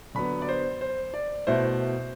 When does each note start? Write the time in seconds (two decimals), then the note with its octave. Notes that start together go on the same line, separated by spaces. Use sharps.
0.15 D3 F#3 B3 B5
0.42 D5
0.49 C5
0.81 C5
1.14 D5
1.47 B2 A3 E4 C5